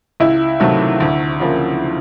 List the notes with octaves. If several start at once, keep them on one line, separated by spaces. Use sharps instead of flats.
C#2 E4
C3 D#3 F#3 A3
D2
C#3 F3 A#3